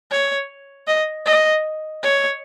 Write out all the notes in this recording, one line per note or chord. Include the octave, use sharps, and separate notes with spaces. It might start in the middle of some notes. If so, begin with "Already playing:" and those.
C#5
D#5
D#5
C#5